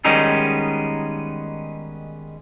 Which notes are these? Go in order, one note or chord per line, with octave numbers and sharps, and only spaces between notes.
D#3 G3 G#3 B3 C#4 D#4